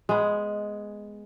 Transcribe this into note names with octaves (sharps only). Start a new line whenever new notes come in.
G#3 B3